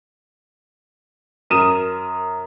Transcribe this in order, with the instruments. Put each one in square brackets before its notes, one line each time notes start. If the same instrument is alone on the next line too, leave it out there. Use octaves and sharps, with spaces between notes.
[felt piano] F#2 A#4 D#6 D#7 E7